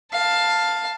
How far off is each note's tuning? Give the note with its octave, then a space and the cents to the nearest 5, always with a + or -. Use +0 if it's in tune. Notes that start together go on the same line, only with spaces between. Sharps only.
F5 +5 A5 +10